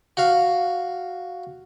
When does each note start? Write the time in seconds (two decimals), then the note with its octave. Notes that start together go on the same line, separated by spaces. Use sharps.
0.17 F#4 F5